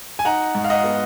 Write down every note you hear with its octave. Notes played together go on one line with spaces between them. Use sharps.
G#5
D#4 F#5 A#5
G#2
F5
D#5 F#5
B3